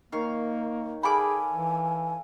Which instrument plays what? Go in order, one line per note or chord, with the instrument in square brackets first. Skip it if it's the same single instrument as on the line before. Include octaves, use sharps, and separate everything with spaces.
[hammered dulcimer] D#3 C#5 C#6 [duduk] A#3 [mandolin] F5
[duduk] G#4 [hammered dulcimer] A4 F5 G5 [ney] G#5 [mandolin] B5 D6
[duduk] E3